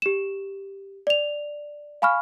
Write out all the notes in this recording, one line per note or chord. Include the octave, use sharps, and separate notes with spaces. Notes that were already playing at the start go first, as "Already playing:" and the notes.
G4 E7
D5 F7
F5 G#5 B5 C#6 F6